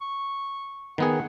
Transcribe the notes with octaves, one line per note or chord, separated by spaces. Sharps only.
C#6
D#3 B3 G#4 F#5